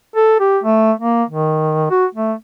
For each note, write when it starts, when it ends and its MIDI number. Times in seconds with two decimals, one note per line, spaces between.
0.16 0.39 69
0.40 0.58 67
0.64 0.92 57
1.00 1.24 58
1.29 1.86 51
1.91 2.06 66
2.15 2.33 57